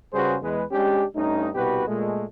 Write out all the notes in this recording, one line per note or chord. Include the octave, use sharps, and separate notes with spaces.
C#3 G3 F#4 G#4 B4 C5
E2 G#3 B4
G#3 C#4 D4 G4
G2 A3 C#4 D#4
C2 B2 F#4 G4 B4
A#2 G#3 A3